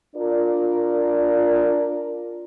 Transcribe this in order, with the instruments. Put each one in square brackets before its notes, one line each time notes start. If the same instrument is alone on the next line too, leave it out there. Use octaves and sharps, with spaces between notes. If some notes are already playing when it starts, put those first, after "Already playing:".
[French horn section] D4 F4 A#4 D5